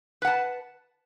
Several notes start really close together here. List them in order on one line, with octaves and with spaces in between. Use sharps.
B4 F#5 A5